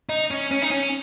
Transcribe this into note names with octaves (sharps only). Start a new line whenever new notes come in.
D#4
C#4
C#4
D#4
C#4